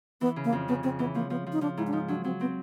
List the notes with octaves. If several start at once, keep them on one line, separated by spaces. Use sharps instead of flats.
E3 B3
C#3
A#3
F2
C#3 B3
C#3 C4
E3 B3
F3 A#3
F3 B3
F3
D#4
F3 D4
G#2 E4
D4
F3 D#4
F#3 D4
F#3 C4
B3 C4